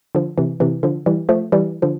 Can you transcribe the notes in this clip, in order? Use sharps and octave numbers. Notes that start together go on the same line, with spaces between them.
D3 F3
C3 E3
C3 E3
D3 F3
E3 G3
F3 A3
E3 G3
D3 F3